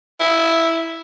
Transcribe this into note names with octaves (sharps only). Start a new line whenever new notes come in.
E4